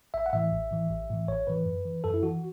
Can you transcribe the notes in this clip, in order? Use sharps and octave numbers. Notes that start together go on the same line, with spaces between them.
A1 E5
F#5
A2 E3 E5
A1
A2 E3
A1
A2 E3
A1 C#5
A2 E3 B4
F#2
E3
F#2 A4
E4
E3 F#4